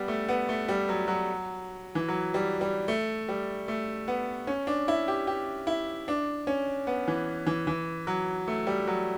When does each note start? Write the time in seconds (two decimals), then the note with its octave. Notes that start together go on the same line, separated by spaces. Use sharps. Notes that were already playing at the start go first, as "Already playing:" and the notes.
Already playing: G3 B3
0.08 A3
0.29 B3
0.49 A3
0.68 G3
0.89 F#3
1.08 F#3
1.95 E3
2.08 F#3
2.34 G3
2.61 G3
2.88 A3
3.28 G3
3.68 A3
4.08 B3
4.47 C#4
4.67 D4
4.88 E4
5.08 G4
5.27 G4
5.67 E4
6.08 D4
6.47 C#4
6.87 B3
7.08 E3
7.47 E3
7.67 E3
8.07 F#3
8.48 A3
8.67 G3
8.87 F#3